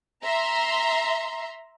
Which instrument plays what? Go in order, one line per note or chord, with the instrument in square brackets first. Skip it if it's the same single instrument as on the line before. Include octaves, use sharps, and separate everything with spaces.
[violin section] E5 A#5 C6